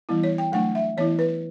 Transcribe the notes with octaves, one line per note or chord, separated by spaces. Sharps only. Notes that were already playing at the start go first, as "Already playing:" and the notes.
E3 G3 B3 E4
C#5
G5
F#3 A3 D4 F#5
E5
E3 B3 E4 C#5
B4